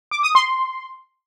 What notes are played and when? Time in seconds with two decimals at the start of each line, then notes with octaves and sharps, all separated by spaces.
0.11 D6
0.23 D#6
0.35 C6